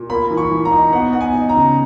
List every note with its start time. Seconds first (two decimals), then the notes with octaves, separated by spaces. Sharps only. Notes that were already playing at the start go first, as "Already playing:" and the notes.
Already playing: A#2
0.10 A#3 B5
0.30 E3
0.37 C#6
0.51 E3
0.65 A#5
0.72 D#4
0.93 B3 F#5
1.13 B3 F#5
1.21 G#5
1.35 D#4
1.49 A#5
1.55 C#3